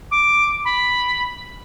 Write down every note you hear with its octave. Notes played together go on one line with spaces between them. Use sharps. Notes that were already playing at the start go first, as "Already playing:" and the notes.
D6
B5